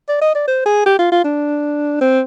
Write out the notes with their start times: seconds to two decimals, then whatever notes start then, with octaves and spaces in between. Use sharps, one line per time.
0.09 D5
0.21 D#5
0.35 D5
0.47 C5
0.65 G#4
0.86 G4
0.99 F4
1.11 F4
1.24 D4
2.01 C4